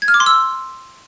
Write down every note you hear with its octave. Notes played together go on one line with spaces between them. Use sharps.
G#6
F6
D6
C6
E6